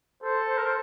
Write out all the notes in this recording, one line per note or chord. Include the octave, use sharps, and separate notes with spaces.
A4 C5
C5
A#4
C5